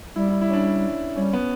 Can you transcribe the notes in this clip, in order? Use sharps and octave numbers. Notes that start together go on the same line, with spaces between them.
G3 E4
E4
E4
C#4
D4
G3 C#4
B3